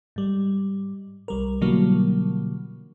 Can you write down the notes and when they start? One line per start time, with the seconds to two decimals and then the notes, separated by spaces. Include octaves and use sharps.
0.16 G#2 G3
1.28 C2 G3 A#4
1.61 B2 D3 E3 F#3 G3 A#3